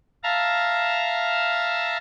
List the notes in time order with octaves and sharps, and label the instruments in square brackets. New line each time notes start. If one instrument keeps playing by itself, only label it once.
[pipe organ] E5 F5 A5 A#5 F6